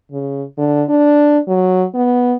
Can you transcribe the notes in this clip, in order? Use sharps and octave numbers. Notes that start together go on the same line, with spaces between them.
C#3
D3
D4
F#3
B3